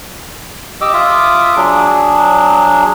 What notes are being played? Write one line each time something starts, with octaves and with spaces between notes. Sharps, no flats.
G4 D#5 D6 E6
F4 E5 D6 D#6
F#3 D4 G#4